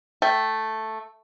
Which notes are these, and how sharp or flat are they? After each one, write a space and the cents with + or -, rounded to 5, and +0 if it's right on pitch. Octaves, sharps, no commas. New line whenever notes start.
A3 +0 G5 -10